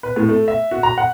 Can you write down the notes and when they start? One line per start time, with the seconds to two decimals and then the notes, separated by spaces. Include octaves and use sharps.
0.03 B4
0.16 A2
0.29 A3
0.48 E5
0.71 F#4
0.83 A#5
0.98 F#5